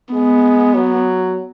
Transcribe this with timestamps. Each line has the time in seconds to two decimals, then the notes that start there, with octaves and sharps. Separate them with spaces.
0.13 G#3 B3
0.75 F#3